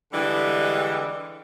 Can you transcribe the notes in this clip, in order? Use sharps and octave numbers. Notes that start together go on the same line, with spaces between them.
D3 E3 G3 G#3